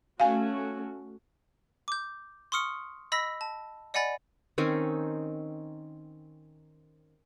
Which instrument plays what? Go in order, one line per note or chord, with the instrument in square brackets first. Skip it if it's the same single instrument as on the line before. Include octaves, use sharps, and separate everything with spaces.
[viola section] A3 C#4 F#4 [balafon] F5 G#5
[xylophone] D6 G6
C6 C#6 D#6 F6 C#7
D#5 B5 E6 A#6 B6
A5
D5 D#5 F#5 G#5 B5 A6
[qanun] D#3 C4 C#4 D#4